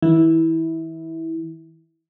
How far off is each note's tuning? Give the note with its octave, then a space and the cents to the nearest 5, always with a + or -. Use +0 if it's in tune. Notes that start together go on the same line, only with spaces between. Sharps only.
E3 -40 E4 -20